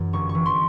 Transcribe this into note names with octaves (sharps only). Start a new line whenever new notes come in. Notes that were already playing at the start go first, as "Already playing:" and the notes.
Already playing: F#2 E3
G1 C#6
C#6
E3
C6